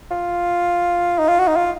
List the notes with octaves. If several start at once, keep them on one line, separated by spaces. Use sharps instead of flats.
F4
D#4
F4
F#4
D#4
F4